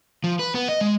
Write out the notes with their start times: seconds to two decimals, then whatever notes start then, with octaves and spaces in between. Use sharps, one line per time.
0.24 F3
0.39 B4
0.55 B3
0.69 D#5
0.81 G#3